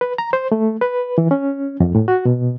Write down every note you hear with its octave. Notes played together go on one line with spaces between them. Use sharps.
B4
A#5
C5
A3
B4
E3
C#4
F2
A2
F#4
B2